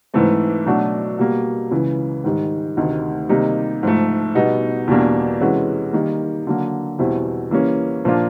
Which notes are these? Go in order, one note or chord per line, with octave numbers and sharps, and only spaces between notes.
G#2 E3 A3 C4
B2 F#3 A3 D4 F#4
B2 G3 A#3
C#2 C#3 E3
G#2 D#3 G3
D2 C3 D#3
C3 D#3 G3 A#3 D#4
G#2 F3 A3
B2 G3 B3 D#4
E2 B2 G3 A#3 D4
C3 E3 G#3 C#4 F#4
D#3 G3 A#3
D3 F#3 A#3
E2 B2 G3 C4 E4
E3 G3 A#3 C#4
A#2 F3 A#3 D4 F4